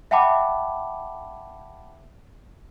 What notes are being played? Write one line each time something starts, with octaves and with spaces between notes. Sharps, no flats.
E5 F#5 G5 A5 B5 D6